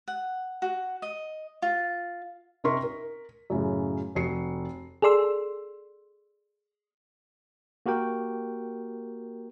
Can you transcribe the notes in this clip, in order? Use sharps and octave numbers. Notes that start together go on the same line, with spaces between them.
F#5
F#4
D#5
F4
C3 D#4 A#4 C6 C#6 B6
A#4
F#2 A2 C#3
F1 F#4 C7 C#7
G#4 A4 D5 C6 E6
A#3 F#4 G4 A#4 G5